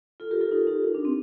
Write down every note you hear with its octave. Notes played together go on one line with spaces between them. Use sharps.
F4 A4
G4 A#4
F4 A4
D#4 G4
D#4 G4
D#4
D4
C4